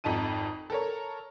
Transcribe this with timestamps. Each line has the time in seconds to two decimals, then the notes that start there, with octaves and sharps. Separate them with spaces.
0.04 G#1 F2 D#4 A5 D#7
0.70 A4 A#4 C#5